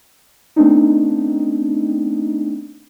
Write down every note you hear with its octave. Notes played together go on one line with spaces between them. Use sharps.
A3 B3 C4 D4 D#4